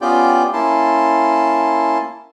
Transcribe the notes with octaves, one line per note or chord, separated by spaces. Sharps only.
B3 C#4 F4 G4 D5 G5
A#3 C#4 E4 A5 C6